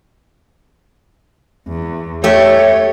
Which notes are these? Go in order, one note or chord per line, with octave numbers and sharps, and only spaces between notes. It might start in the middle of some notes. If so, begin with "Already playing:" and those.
E2
A3 G4 C#5